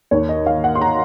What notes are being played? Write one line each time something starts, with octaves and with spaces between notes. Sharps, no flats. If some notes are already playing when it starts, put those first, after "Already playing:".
D#2 C#5
D#5
D#3 F5
F#5
C6
A#5